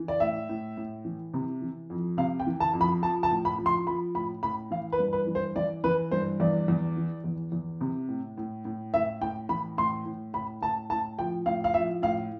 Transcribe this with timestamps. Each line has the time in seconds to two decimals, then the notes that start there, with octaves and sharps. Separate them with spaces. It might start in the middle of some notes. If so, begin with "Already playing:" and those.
Already playing: E3
0.08 D5
0.20 A2 E5
0.49 A2
0.77 A2
1.05 E3
1.34 C3
1.61 E3
1.90 F2
2.17 C3 F5
2.40 G5
2.47 E3
2.60 A5
2.74 F2
2.81 B5
3.02 F3 A5
3.23 A5
3.31 A2
3.45 B5
3.58 F3
3.66 C6
3.87 F3 B5
4.15 A2 B5
4.43 A2 B5
4.71 E3 F5
4.92 B4
4.99 G2
5.13 B4
5.27 E3
5.35 C5
5.56 E3 D5
5.84 E3 B4
6.11 G2 C5
6.40 E2 D5
6.68 E2
6.97 E3
7.24 E2
7.52 E2
7.81 C3
8.08 A2
8.37 A2
8.65 A2
8.94 A2 E5
9.21 A2 G5
9.49 E3 B5
9.78 A2 C6
10.05 A2
10.33 A2 B5
10.61 A2 A5
10.90 A2 A5
11.19 F3 G5
11.46 A2 F5
11.64 F5
11.74 F3 E5
12.02 A2 F5